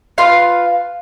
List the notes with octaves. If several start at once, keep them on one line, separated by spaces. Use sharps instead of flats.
F4 B4 F5